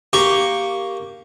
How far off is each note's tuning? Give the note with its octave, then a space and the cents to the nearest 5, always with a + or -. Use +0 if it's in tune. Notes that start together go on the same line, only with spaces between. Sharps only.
A#3 +0 G4 +0 C#6 +0